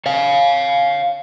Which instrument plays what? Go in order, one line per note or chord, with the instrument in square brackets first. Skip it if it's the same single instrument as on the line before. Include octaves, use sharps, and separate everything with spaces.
[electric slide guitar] C#5 F5